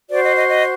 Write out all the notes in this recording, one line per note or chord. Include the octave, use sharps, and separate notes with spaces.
F#4 C5 D5
D#5
D#5
D#5